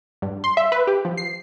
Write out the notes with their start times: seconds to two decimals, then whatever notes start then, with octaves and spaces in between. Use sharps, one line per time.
0.22 G2
0.44 C6
0.57 E5
0.72 B4
0.87 G4
1.05 F3
1.17 C7